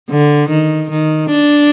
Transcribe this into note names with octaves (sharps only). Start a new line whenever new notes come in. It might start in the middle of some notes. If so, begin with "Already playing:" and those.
D3
D#3
D#3
D4